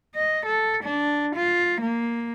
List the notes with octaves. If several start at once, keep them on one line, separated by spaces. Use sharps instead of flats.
D#5
A4
D4
F4
A#3